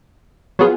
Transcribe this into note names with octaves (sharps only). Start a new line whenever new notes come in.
F#3 B3 F4 G#4